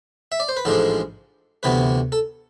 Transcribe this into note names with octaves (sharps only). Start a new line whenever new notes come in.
E5
D5
C5
B4
A1 G#2 F3 G#3 D4 A4
D2 C3 E3 B3 B4
A4